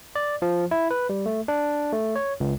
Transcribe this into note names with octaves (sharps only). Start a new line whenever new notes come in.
D5
F3
E4
B4
G3
A3
D4
A3
C#5
C#2